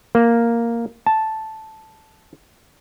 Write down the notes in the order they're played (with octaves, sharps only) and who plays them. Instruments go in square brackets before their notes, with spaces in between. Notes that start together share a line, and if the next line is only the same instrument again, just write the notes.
[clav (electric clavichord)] A#3
A5